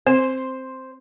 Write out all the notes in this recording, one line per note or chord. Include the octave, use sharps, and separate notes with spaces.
C4 C5